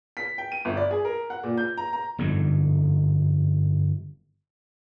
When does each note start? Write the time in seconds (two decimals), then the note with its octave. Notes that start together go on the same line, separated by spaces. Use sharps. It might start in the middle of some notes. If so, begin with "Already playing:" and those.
0.17 B6
0.38 G5
0.52 D#7
0.65 G1
0.77 D5
0.91 G#4
1.05 A#4
1.30 F#5
1.43 A#2
1.58 G6
1.77 A#5
1.93 A#5
2.18 G1 F2 G#2 D3